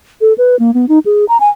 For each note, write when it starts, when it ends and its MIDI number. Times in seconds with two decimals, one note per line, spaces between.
0.21 0.33 69
0.38 0.58 71
0.59 0.73 58
0.74 0.86 59
0.89 0.99 63
1.06 1.25 68
1.29 1.37 82
1.40 1.49 80